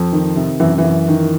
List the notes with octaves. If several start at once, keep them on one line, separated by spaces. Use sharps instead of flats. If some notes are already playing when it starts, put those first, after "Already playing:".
Already playing: F2 F3
D#3
C3
F#2 E3
E3
F#2
D#3